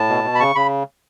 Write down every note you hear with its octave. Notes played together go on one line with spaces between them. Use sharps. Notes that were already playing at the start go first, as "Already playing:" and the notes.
Already playing: A2 A5
B2
B2
B5
C#3 C#6
C#3 B5